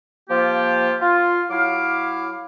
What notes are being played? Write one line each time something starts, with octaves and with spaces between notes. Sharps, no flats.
F3 A#3 F4 G4
F4
F#3 E4 F5 D6